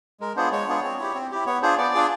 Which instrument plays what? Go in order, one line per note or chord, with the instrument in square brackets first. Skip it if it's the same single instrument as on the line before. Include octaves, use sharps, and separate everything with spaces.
[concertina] G#3 A#4
B3 D4 F4 G#4 C5
G#3 C#5
B3 D4 F4 G#4
C4
E4 G4
C4
E4 G4
B3 C#5
D4 F4 G#4 C5
B3 D5
D4 F4 G#4